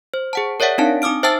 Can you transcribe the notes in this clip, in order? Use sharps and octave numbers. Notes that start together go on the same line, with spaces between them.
C5
G#4 F#5 A5
A#4 C#5 D5 E5 F#5
C4 D4 D#4 F5 A5
D#4 D6 D#6 F6 D7
C5 E5 G5 A5 E6 A6